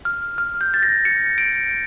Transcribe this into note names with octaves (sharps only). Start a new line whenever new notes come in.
F6
F6
G6
A6
A#6
C#7
D7